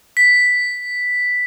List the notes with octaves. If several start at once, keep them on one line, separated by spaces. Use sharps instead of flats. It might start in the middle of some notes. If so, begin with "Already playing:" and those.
B6